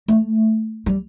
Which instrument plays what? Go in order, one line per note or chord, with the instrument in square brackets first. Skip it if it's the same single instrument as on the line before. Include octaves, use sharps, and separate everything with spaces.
[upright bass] A3
G3